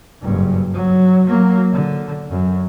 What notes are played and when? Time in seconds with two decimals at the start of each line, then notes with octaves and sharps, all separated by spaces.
0.22 F#1 G2
0.73 F#3
1.26 F#3 A#3
1.73 D3
2.30 F#2